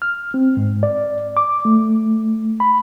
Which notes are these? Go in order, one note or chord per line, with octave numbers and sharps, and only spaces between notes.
F6
C4
G#2
D5
D6
A3
B5